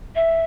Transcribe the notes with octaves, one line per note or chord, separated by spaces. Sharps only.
E5